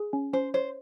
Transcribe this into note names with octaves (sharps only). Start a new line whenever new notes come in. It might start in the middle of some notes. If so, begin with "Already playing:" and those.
Already playing: G#4
C#4
C#4 C5
C5 C#5